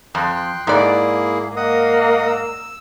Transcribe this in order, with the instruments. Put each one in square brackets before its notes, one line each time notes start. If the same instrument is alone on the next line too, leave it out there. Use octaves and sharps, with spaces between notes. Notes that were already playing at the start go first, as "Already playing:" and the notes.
[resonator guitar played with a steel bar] F2 [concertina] G5 C6 F#6
[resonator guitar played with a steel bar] G#2 D5 [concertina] A#3 E4 G#4
[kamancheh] A#3 [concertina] D#5 F#5 D#6
[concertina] E6